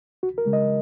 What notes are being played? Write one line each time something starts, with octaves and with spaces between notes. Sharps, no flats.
C#2 F#4
A#4
C#3 G#3
D#5